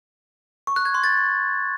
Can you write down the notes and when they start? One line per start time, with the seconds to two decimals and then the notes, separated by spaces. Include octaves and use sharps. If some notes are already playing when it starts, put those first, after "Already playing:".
0.67 C#6
0.76 F#6
0.85 G#6
0.94 C6
1.04 A6